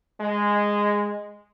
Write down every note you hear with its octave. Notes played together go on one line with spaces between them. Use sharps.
G#3